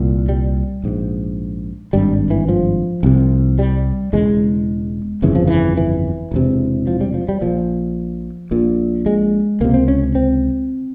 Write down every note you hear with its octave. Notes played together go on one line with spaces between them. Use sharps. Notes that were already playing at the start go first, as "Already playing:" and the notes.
Already playing: C2 A#2
G3
A#1 G#2
G#1 G2 G3
E3
F3
C2 C3
G3
E1 E2 C#3 G#3
G1 F2 C#3 E3
F3
E3
E3
E1 E2 C3
F3
G3
F3
G3
A#1 A#2 F3
A#1 A#2
G#3
C#2 C3 A#3
C4
C#4
C4